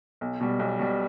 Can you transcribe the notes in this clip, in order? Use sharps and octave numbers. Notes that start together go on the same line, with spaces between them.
B1
B2 G3
B1
B2 G3